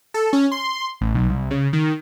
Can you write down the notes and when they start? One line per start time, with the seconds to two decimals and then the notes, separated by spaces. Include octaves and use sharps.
0.14 A4
0.33 C#4
0.52 C6
1.01 A1
1.15 B1
1.29 C2
1.51 C#3
1.73 D#3